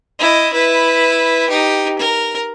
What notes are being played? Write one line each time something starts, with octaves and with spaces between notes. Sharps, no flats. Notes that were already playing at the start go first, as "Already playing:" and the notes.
E4 D#5
E4 B4
D#4 G4
A#4